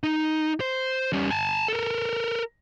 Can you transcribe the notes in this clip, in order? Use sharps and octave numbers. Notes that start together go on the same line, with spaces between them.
D#4
C5 C6
G3 C#4
G#5 A5
A4 A#4